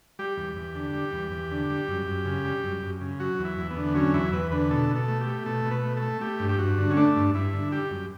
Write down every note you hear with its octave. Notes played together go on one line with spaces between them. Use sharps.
G3 G4
E2
E2
D3
G3
E2
E2
D3
G3
F#2
F#2
C#3
G3
F#2
F#2
C#3
F#3 F#4
E2
E4
E2
B3
D3
F#3 C#4
E2 E4
E2 B4
D3 B4
B2 A4
B2
A4
A3
G4
A3
B2 A4
B2
B4
A3
A4
A3
A3 G4
G2
G4
G2 F#4
D3
C#4
A3 D4
G2
G2 E4
D3
G3 G4
F#2